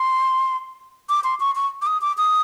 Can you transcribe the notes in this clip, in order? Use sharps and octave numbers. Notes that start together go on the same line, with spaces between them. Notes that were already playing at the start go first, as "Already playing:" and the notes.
Already playing: C6
D6
C6
C#6
C#6
D6
D#6
D6
D#6